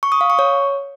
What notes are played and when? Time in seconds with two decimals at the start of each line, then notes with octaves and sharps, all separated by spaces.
0.03 C#6
0.12 D#6
0.21 F5
0.30 C#6
0.39 C#5